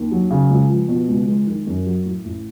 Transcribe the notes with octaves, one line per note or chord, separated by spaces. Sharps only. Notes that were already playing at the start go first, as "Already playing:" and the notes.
Already playing: D#2
F#3
C#3
C#2
F3
B2
C#2
G#3
D#3
F#2
F#3
A2
A1